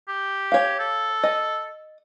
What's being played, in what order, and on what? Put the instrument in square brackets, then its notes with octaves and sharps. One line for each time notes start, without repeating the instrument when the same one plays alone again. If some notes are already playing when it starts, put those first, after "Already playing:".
[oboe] G4
[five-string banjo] C#5 F5
[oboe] A4
[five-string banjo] D#5